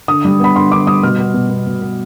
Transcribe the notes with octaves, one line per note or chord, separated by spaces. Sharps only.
D3 D#6
G3
B3 B5
D3 C6
D3 D6
G3 D#6
B2 F6
B3
B2
B3
B2
B3